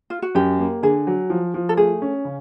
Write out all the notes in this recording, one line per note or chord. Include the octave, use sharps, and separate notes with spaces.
F4
F#4
F#2 G4
A#3
D3 G#4
F#3
F3
F3
A4
A3 G#4
C#4
C#3